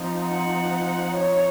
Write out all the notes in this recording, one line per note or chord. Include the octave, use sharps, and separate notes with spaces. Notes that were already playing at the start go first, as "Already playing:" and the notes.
Already playing: F3 C4 D#4
F#5
C#5